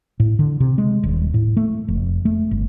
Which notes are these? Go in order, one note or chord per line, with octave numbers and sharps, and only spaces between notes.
A2
D3
C3
G#3
D#1
A2
A3
F1
A3
G1